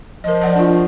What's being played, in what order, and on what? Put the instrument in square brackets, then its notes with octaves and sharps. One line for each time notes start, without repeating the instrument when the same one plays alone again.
[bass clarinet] F3 [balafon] A#4 D#5
[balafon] D5 F#5 A5
D4 F4